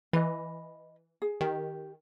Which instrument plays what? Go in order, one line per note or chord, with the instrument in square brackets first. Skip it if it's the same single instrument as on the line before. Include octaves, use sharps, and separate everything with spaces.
[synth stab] E3 [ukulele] D#5 B5
[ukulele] G#4
[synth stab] D#3 [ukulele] G4